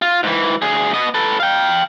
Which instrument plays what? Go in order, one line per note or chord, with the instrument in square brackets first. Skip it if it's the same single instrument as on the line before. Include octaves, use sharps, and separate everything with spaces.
[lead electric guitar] F4
G#2 E3
D2 G#4
B3 D#5
A4 B4
F5 G5